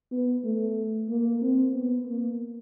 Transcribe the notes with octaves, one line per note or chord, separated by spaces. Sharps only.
B3
A3
A#3
C4
B3
A#3